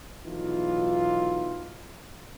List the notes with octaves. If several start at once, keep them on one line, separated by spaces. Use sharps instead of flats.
B1 E3 D#4 F4